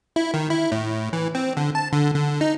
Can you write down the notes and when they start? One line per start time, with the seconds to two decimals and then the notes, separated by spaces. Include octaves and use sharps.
0.16 E4
0.34 D#3
0.50 E4
0.72 A2
1.13 E3
1.35 C4
1.57 D3
1.75 A5
1.93 D3
2.15 D3
2.41 D#4